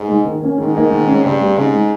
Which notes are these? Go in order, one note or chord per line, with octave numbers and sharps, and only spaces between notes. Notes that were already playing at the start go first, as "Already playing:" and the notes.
Already playing: G#2
G#3 D#4
D#3
A#3 C#4
G#2 D#3
A#3 D#4
D#3
G#3 C#4
G2 C#3
G3 C4
G#2 C#3
G#3 D#4